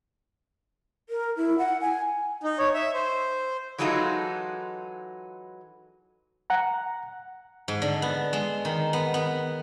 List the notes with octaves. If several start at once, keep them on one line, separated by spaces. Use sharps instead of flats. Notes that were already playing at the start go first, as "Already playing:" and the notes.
A#4
E4
F#5
G#5
D#4
C#5
E5
C5
E3 F#3 G#3 D#4 F4 A4
F#5 A#5
G#2
D3
B3
G#3
D#3
B3
B3